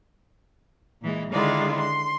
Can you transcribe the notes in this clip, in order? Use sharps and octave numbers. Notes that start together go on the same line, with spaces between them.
A#2 E3 G#3
D3 D#3 G#3 D4 E4 F4
C6